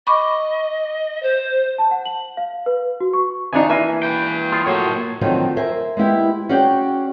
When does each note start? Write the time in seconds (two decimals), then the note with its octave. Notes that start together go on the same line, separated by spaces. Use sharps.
0.07 D#5 B5 C#6 D6
1.22 C5
1.78 A5
1.91 F#5
2.05 F#7
2.37 F5
2.66 B4
3.01 F#4
3.13 C#6
3.53 G#1 D4 D#4 G#5
3.69 E3 A#3 E5 G#5
4.03 B4 G5
4.52 F4 G#4
4.67 A2 F#3 A#3 C#5 C6
5.21 D3 D#3 F3 F#3 C4 D#4
5.57 A#4 C5 E5 G#5
5.97 G#3 B3 E4 G4
6.49 C#4 F#4 G#4 D5 G5